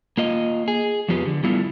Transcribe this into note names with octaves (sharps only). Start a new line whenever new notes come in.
A#3 F4 D#5
G#4
F2 F3 B3 F4 G4 B4
D3
G3 A3 B3 E4 F4